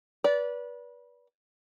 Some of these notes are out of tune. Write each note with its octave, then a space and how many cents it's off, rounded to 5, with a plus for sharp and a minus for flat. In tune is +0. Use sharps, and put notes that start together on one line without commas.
B4 -25 D5 -25